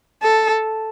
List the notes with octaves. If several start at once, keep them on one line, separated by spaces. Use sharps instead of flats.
A4